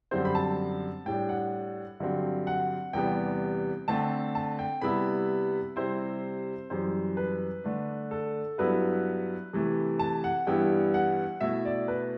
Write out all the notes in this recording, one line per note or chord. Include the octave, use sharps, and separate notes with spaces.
F#2 D3 G3 C4 C5
B5
A5
A2 G3 D4 G5
F#5
G2 D3 F#3 C4
F#5
E2 C3 E3 G3 B3 G5
D3 A3 C4 A5
A5
G5
C3 G3 B3 E4 B5
C3 G3 C4 E4 C5
F#2 E3 G3 C5
B4
D3 A3 D4
A4
G2 F#3 B3 E4 B4
C3 E3 A3
A5
F#5
G2 E3 G3 B3 E4 G5
F#5
B2 A3 E4 E5
D5
B4